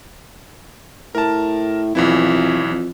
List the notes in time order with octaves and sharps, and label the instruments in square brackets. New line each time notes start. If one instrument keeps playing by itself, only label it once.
[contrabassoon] A2 [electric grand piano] A#4 A5
[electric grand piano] B1 E3 E4 [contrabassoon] F2
[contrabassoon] F2